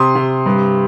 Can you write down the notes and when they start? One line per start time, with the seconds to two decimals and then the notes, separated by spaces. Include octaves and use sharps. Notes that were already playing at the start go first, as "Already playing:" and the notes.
Already playing: C3 C6 D#6
0.15 C3
0.46 G2